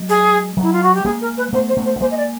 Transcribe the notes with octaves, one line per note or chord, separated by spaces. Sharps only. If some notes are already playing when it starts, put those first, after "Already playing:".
Already playing: F#3 G#3
G#4
F#3 G#3
E4
F4
F#4
G4
G#3 A#3 G#4
A#4
B4
A3 B3 C5
C5
A3 B3
C5
B3
G#3 A#3 C5
D#5
D5